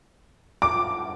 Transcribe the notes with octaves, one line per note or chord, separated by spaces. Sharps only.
D6